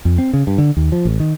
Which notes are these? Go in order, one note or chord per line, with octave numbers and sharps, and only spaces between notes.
F2
C4
C#3
G2
D3
D#2
F3
A1
D#3